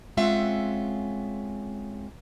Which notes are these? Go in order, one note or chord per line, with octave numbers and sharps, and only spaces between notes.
G#3 C4 C#4 F4 E5 F#5